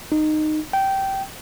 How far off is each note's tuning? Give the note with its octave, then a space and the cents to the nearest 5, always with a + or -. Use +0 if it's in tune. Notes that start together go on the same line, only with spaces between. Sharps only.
D#4 -15
G5 -15